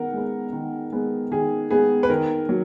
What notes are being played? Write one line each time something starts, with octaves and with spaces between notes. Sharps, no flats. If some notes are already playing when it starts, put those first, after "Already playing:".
Already playing: D#3 G#3 B3 A#4 F#5
G#3 B3
D#3
G#3 B3
D#3 G#4
G#3 B3 G#4
B4
D#3 A#4
F#3